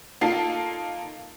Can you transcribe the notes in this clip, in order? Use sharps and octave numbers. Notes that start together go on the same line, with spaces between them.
A#3 D#4 F4 A4 C7